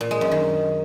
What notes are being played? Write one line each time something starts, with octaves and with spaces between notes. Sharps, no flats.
A#2
G#3
F#2
D#3